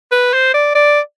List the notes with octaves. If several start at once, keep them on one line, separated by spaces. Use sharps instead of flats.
B4
C5
D5
D5